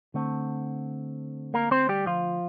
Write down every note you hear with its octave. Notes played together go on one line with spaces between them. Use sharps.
D3 A3 C4
A#3 A#4
C4 C5
G3 G4
F3 F4